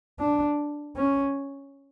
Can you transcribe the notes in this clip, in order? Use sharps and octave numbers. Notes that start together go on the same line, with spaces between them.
D4
C#4